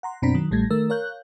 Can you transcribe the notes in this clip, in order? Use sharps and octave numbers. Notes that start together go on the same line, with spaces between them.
F#5 A#5 C6
F#2 B2 C4 D4 A#5 B6
D#3 F#3
A1 A2 G3 A3 G#6 A#6
D#3 A3 A#4 E6
A#4 C#5 F5 F#6 G6